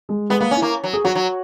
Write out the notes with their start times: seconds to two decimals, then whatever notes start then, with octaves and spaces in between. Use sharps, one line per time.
0.09 G#3
0.30 G#3 B3
0.40 A#3 B3
0.51 C#4
0.57 E4
0.62 A#3
0.84 F#3
0.93 G#4
1.04 F#3 F#4
1.15 F#3